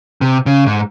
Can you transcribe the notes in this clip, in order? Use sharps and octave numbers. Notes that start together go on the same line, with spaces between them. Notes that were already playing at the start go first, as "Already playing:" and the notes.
C3
C#3
G#2